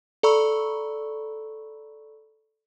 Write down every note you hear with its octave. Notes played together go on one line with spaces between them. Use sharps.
A4 D5 A#5 B5 C#6 E6